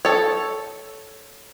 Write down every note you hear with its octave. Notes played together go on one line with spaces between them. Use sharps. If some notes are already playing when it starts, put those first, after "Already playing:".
A4 C#5